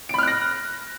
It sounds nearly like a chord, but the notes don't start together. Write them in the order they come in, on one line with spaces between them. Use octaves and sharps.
D7 B5 F6 F#6 A#6